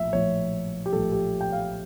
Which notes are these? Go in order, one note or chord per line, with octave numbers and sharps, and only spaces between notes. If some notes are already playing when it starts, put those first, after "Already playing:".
Already playing: A#1 A2 F3 E5
A#1 A2 F3 C#5
G4
A#1 A2 F3 A4
G4
G5
F5